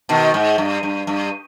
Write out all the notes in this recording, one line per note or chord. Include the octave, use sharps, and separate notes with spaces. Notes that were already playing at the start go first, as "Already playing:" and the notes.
B2 D#3
G#2
G2
G2
G2